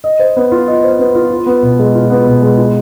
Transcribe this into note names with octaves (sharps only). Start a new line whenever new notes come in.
D#5
C5
B3
F4
D#5
C5
B3
F4
F4
B3
B2
G#3
F4
B3
B2
G#3
F4